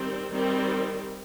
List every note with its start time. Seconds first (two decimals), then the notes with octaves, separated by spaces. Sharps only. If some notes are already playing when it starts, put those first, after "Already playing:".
Already playing: D#3 G3 C4
0.29 D#3 G3 C4